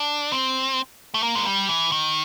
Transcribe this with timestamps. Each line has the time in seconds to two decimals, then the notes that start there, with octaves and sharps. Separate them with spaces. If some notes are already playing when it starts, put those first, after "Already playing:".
Already playing: D4
0.32 C4
1.14 A3
1.23 A#3
1.35 G#3
1.46 G3
1.69 E3
1.92 D#3